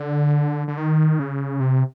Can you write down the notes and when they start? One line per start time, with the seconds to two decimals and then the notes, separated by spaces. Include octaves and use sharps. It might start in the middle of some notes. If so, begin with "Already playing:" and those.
Already playing: D3
0.68 D3
0.77 D#3
1.19 C#3
1.60 C3